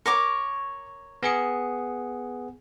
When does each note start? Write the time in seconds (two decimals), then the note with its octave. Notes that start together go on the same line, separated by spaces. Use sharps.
0.06 A#4 C#5 C#6 D6
1.23 B3 G#4 C#7